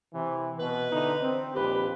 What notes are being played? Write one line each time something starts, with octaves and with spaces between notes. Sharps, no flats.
C3 E3
B2 B4
D3 E3 D#4
C4
A#1 D#2 G4 B4